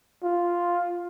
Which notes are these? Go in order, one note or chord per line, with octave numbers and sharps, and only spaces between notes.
F4